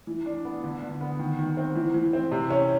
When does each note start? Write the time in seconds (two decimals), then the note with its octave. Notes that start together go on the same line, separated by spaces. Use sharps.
0.07 E3
0.26 D4
0.45 B3
0.64 D3
0.82 D3
1.01 B3
1.19 D#3
1.39 D#3
1.57 C4
1.75 E3
1.94 E3
2.13 C4
2.32 C3
2.50 C#4